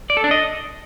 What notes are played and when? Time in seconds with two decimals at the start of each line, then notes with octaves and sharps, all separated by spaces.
0.10 D5
0.17 A4
0.24 D4
0.31 D#5